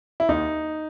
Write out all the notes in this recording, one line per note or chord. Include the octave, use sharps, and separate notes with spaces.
E4
D#2 D#4